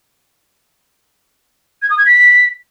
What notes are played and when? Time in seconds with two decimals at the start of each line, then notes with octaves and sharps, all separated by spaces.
1.82 G#6
1.90 D#6
1.98 G#6
2.06 B6